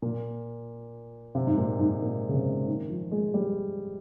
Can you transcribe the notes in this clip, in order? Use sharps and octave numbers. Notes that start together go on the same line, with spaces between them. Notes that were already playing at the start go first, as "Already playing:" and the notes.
A#2
C3
G#2
A#2
G#2
A#2
C#3
C3
D#3
F3
G#3
G3